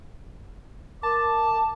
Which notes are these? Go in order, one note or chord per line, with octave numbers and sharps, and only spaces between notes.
A#4 A5 D6